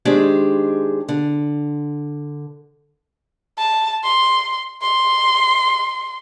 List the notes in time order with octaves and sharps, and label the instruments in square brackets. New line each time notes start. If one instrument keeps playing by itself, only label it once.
[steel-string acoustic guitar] D#3 G#3 D4 G4 G#4 C5
D3
[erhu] A5
C6
C6